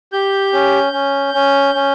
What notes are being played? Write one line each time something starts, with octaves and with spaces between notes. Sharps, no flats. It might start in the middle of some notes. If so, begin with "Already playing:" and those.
G4 G6
C#4
C#4
C#4
C#4